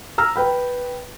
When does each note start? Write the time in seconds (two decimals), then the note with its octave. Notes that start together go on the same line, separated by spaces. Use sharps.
0.18 A#5 E6 F6
0.36 B4 G5 B5